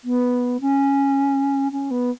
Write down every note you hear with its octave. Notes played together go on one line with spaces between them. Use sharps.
B3
C#4
C#4
B3